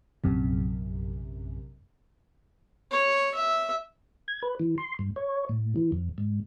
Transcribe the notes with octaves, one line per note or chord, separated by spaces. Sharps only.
A#1 F#2 C3
C#5
E5
G#6
B4
E3
C6
G2
C#5
A2
E3
F2
G#2